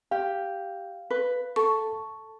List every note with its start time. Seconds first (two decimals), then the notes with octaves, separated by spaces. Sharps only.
0.11 G4 F5
1.10 B4
1.56 A4 C#6